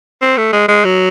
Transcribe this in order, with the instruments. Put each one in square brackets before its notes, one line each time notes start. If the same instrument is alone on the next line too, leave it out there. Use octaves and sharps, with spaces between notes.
[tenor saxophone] C4
A3
G#3
G#3
F#3